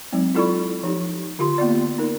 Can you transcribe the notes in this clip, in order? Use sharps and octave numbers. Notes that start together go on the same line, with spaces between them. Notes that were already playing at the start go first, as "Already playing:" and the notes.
F#3 G#3 C4 D#4
E4 F4 A4 D5 B5 C#6
F3 D#4 G4
D3 F4 G4 C6
A#3 B3 F4 D5
D#4 A#4